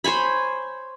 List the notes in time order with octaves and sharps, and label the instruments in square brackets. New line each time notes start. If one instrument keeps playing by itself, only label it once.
[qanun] C5 C#5 G#5 B5